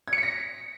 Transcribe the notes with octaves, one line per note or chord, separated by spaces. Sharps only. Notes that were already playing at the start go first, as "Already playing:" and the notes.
G#6
C#7
B6
A#6